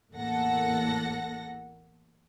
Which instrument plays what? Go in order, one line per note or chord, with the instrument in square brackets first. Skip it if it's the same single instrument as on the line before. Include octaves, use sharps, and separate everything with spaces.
[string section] A1 E2 A#3 A4 F#5 A#6